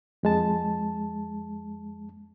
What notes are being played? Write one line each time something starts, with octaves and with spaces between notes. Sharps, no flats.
F2 G#3 A5